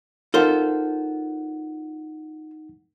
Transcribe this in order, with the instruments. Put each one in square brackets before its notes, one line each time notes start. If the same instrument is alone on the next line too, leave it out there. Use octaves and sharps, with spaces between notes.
[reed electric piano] D#4 F#5 [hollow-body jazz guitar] F4 A4 C5 [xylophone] A#4